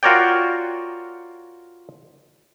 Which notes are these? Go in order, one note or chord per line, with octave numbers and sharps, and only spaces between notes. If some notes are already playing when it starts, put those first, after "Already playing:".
F4 F#4 A#4 C#5 D5 G5